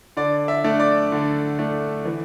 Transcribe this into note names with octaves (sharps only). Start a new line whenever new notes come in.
D3 D5
E5
A3 D4
D5
D3
A3 D4
E3